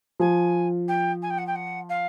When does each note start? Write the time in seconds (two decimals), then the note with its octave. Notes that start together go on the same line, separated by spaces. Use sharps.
0.20 F3 G#5
0.88 G5
1.22 G#5
1.30 G5
1.38 F#5
1.46 G5
1.55 F#5
1.89 F5